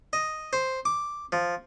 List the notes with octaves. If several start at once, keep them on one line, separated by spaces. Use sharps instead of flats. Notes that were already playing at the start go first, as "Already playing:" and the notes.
D#5
C5
D6
F3